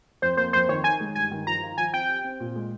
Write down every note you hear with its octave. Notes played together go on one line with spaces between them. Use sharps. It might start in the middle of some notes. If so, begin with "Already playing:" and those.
F2 C5
A#3 C5
F2 C5
D#3 C#5
D#4 G#5
G#3
G2 G#5
D#3
F3 A#5
F4
F3 G#5
C4 G5
G4
C4
A#2
G#3